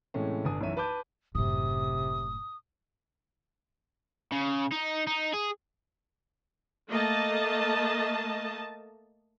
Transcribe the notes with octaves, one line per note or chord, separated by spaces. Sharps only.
A2 C3 E3 G#3 A3 C#4
G1 D4 G#5 D#6
B1 F#2 E3 C#5 E5 D#7
B4 A5 B5 D6 G6
F#1 A2 C3 D#6
C#3
D#4
D#4
G#4
A3 A#3 D#5 A5